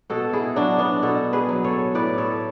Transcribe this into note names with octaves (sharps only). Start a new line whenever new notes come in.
B2 F#4 A4
E4 G#4
F#3 D4 F#4
B3 D4
B2 F#4 A4
G#4 B4
F#3
A4 C#5
A2 B4 D5
A4 C#5